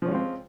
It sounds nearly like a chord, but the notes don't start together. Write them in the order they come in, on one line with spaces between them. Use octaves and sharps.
F3 C#4 G#3 F4 C4